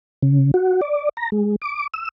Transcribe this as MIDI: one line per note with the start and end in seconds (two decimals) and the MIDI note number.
0.23 0.51 49
0.54 0.81 66
0.81 1.09 74
1.17 1.30 82
1.32 1.56 56
1.62 1.87 86
1.94 2.09 88